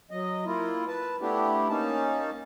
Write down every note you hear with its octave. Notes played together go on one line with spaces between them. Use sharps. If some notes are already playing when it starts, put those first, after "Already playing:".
F#3 D#5
A#3 E4 F4
B4 A5
A3 B3 D4 E4 G4
A#3 C#4 D#4 A5